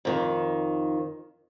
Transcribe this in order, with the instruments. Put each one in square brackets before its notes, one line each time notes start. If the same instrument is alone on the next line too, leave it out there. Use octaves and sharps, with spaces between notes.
[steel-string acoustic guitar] F2 D#3